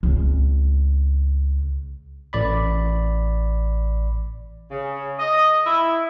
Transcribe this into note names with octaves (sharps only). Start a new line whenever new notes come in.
C#2 C4
A1 D5 B5
C#3
D#5
E4